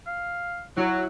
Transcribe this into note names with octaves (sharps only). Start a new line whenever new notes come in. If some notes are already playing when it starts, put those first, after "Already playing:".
F5
F#3 E4 F#5